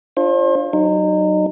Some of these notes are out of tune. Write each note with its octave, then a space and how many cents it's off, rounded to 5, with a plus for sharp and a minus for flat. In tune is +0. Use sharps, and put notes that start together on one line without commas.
D4 +0 F4 -15 C5 +40
F#3 +25 D#4 -25